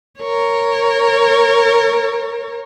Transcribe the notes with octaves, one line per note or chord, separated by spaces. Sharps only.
A#4 C#5